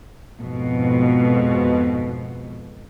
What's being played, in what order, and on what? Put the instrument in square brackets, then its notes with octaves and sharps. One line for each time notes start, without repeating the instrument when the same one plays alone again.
[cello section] F2 G#2 B2